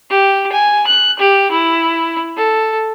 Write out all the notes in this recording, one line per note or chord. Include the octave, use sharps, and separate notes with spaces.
G4
G#5
F#6
G4
E4
A4